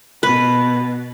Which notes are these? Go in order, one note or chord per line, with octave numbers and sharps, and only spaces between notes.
B2 B4